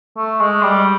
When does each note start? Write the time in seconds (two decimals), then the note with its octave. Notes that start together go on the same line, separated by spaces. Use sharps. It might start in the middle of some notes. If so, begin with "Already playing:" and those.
0.17 A3
0.40 G#3
0.62 G3